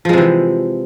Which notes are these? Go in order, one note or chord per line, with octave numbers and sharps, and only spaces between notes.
C3 E3 F3 G#3